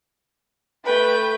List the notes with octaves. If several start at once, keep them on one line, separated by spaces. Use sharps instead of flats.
A3 B4 G5